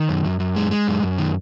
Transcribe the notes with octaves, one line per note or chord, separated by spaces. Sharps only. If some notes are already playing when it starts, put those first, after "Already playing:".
Already playing: D#3
F#2
F#2
F#2
G#3
G#3
F#2
F#2
D#3